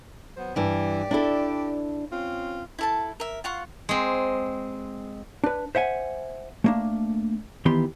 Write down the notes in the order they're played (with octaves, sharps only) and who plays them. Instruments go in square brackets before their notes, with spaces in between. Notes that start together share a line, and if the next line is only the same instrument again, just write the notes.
[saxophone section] F#3 B3 C5
[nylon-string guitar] G2 E3 [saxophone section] G4 D5
[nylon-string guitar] D4 E4 A4
[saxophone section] C4 C#4 F4
[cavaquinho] E4 A4 A5
A#4 E5
F4 F5 F#5 C#6
[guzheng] G#3 C4
[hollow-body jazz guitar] D4 B4
C5 E5 F#5 G#5
A3 A#3 D4
D#3 E3 B3 G4 C6